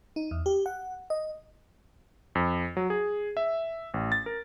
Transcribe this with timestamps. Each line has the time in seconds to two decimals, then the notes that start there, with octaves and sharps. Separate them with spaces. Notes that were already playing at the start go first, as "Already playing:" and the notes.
0.16 D#4
0.31 E2
0.46 G4
0.66 F#5
1.10 D#5
2.35 F2
2.77 F#3
2.90 G#4
3.37 E5
3.94 A1
4.12 A6
4.26 A#4